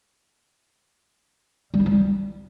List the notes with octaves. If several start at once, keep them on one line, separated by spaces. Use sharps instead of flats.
G3
E4
F3
G3